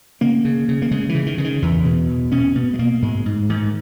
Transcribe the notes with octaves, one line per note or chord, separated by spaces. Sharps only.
C#3 A#3
C#3
C#3
A#3
C#3 G#3
E3
C#3
D#3
C#3 E3
D#3
E2 E3
B2
E2
B2 C#4
B2 B3
G#3
B2 A#3
G#2 G#3
G#2
G#2 D#3